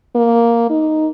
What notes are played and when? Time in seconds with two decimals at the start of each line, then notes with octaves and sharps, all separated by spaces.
0.15 A#3
0.70 D#4